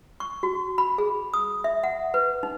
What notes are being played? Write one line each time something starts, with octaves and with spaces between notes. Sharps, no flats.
C#6
F#4
B5
G#4
D#6
E5
F#5
B4
D#4